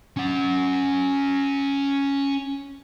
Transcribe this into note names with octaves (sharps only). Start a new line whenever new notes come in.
C#4 F#5